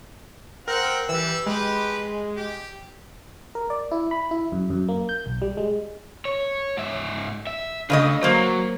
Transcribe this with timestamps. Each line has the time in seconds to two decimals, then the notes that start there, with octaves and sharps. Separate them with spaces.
0.68 C4 A#4 F#5 G5
1.09 E3 G3 E6
1.46 G#3 G4 B4
2.36 G4
3.55 A#4
3.70 D5
3.91 E4
4.11 B5
4.31 E4
4.52 F#2
4.70 F#2
4.89 A#3
5.09 G6
5.26 B1
5.42 G3
5.57 G#3
6.25 C#5
6.77 G#2 E5
7.47 E5
7.90 C#3 A3 D4 B4 D#5
8.23 F#3 A#3 C5